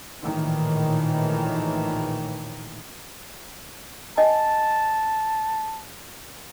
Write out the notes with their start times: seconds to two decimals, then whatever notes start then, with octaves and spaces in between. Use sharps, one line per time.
0.20 A#1 A2 D#3 E3
4.17 C#4 D#5 G#5 A5